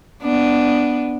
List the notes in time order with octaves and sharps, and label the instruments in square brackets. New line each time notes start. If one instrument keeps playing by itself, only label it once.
[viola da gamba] B3 D4